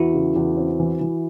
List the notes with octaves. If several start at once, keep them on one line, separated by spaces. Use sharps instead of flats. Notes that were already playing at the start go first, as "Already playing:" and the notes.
Already playing: E2 E4 F#4
C#3
E2
C4
E3
E3